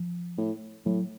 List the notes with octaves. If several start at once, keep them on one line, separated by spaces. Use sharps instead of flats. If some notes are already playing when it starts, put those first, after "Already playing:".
Already playing: F3
A2
A2 F#3